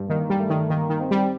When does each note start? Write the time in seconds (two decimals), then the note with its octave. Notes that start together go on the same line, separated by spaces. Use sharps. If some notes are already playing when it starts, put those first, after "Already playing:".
Already playing: G2
0.09 D#3 A#3
0.30 G3
0.40 A3
0.50 D#3
0.70 D#3 A#3
0.90 D#3
1.01 C4
1.11 G3